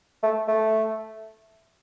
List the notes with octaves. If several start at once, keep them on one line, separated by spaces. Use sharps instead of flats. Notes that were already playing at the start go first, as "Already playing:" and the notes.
A3
A3